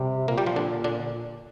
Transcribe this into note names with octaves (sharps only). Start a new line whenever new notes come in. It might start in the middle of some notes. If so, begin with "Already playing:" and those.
Already playing: C3 G3 G4
A#2 A#3 A#4
G3 G4
F3 F4
D3 D4
D3 D4